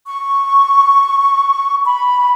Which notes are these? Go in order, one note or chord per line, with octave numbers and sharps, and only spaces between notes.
C#6
B5